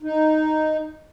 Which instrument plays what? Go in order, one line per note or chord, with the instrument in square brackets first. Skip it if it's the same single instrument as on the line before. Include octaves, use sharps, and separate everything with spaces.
[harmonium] D#4